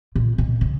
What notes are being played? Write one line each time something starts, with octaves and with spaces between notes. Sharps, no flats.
A#2
B2
C#3